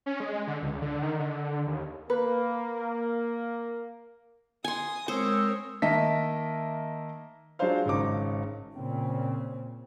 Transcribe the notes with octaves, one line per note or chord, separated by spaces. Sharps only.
C#4
G#3
D3
C#2
D3
D#3
D3
D#2
A#3 B4
G#5 C6 D#6
G#3 C4 A#4 C5 C#5 D#6 E6
D#3 A#3 D#5 E5 A5 B6
F#3 D4 F4 G#4 C5 F5
G#1 C#3 D#4 D6
A#2 C#3 C4